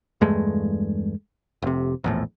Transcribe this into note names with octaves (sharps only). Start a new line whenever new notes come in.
E2 G2 G#3 A3
F1 C3
A#1 E2 A2